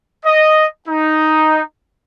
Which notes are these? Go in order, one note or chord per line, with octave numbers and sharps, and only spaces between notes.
D#5
D#4